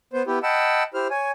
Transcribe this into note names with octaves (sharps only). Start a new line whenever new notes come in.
B3 C5
B3 E4 G4
D#5 F#5 G5 A5 B5 E6
E4 G4 C5 F6
C#5 G#5